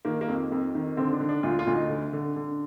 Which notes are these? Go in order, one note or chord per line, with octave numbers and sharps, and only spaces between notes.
D#3 A#3
A#3
F2
F2
D#3
D3 C4
D4
D3
D4
D2 F4
F4
D2
D#4
D3
D3
D3